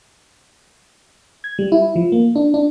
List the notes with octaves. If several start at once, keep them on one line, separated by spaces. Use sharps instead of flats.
G#6
G3
E4
F3
A#3
D4
D4